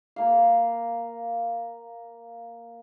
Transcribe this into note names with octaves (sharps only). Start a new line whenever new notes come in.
A#3 F5